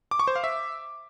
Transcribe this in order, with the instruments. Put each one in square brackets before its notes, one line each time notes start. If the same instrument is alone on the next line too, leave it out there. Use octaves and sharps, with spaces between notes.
[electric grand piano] D6
C#6
C5
F5
E5